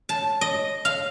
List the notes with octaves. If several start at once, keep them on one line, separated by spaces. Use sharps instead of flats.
A5
D#5
F5